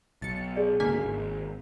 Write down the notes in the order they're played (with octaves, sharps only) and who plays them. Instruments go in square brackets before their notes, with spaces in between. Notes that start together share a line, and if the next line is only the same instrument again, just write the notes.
[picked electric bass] B1 [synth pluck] A6 C#7
[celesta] G#4 D5
[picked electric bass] C#2 G#2 D3 [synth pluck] A#3 G#5 B6
[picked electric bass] G#1